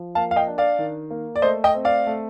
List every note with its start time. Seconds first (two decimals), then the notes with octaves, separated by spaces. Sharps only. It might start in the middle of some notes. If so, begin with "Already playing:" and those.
Already playing: F3
0.15 A#3 F5 A5
0.31 F5
0.36 D#5 G5
0.47 D4
0.58 D5 F5
0.79 D#3
1.11 A#3
1.36 D5
1.42 A3 C5 D#5
1.64 D#5 G5
1.74 C4
1.85 D5 F5
2.07 A3